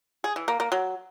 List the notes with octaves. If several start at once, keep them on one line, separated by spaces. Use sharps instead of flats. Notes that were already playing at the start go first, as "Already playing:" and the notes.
G#4
E3
A#3
A#3
F#3